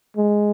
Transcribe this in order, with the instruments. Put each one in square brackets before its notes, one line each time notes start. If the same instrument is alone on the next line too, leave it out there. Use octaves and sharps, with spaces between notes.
[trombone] G#3